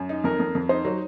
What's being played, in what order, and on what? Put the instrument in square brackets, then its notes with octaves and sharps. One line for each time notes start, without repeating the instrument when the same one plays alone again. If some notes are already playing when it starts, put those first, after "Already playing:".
Already playing: [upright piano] F#2
D#4
[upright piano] F2 [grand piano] A#4
[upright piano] F2
F2
[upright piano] D#4 [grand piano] C5
[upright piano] F#3